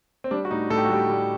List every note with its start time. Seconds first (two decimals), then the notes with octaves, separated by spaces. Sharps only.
0.24 C4
0.31 G3 D4
0.45 F#4
0.51 A2 D#4
0.70 A2 A4
0.78 G4
0.85 F#4
0.90 G3 G4
1.10 G3